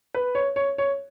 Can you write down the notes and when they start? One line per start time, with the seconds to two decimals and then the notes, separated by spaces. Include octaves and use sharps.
0.14 B4
0.35 C#5
0.56 C#5
0.78 C#5